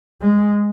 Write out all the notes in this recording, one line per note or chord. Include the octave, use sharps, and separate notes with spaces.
G#3